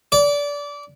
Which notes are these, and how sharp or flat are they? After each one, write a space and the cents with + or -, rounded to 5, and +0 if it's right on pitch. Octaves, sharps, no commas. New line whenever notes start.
D5 -25